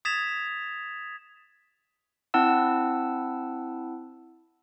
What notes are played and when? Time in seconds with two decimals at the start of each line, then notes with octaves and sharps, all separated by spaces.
0.05 D#6 G#6 A6 B6 E7 F7
2.34 C4 E4 F#5 A5 E6